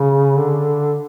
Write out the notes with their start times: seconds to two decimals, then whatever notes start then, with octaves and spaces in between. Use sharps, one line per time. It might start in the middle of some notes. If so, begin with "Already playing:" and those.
Already playing: C#3
0.37 D3